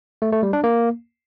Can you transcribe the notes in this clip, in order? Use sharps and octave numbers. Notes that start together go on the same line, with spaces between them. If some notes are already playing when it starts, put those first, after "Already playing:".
A3
A3
G3
D4
A#3